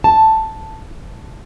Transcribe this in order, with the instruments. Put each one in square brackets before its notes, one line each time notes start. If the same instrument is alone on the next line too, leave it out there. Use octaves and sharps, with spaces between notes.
[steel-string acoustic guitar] A5